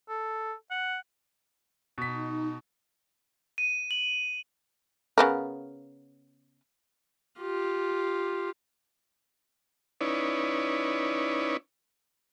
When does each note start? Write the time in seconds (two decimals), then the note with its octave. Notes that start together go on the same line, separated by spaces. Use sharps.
0.09 A4
0.71 F#5
1.98 B2 D#4 B6
3.58 D#7
3.91 F#7
5.18 C#3 B3 A#4
7.40 F4 G4
10.01 C#4 D#4 E4 B4 C#5 D5